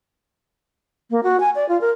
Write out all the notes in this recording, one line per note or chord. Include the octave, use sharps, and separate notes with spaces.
A#3
F#4
G#5
D5
F4
A#4